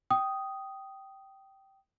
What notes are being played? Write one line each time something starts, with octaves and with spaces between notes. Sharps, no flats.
G5 D#6